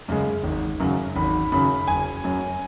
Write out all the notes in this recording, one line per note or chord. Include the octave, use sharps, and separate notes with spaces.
F#2 C#3 G#3
G#1
F#2 C#3 F#3
G#1 B5
F#2 C#3 F#3 B5
F#1 G#5
F#2 F#3